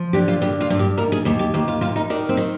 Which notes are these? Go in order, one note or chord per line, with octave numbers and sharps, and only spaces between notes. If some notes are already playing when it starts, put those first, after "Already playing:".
Already playing: F3
D3 G4
F4
G2 G4
F4
G2
G4
D#2 A#4
G#4
D#2 G4
G4
D#2 G4
F4
D#2 F4
D#4
D#3 D4
C4
D#3